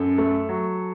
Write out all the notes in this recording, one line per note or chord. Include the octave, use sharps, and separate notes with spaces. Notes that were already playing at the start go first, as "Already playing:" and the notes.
Already playing: F#2 A4
A3
F#3